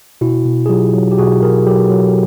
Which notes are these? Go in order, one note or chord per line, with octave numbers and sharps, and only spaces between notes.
B2 E4 F#4
B2
G#4
F#3 F4 G4
F#3
G4
B2 F#4 G#4
B2 G#4 A#4
F#3 G4 A4
F#3